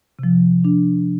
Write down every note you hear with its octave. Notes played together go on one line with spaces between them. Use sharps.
C3 F3
D4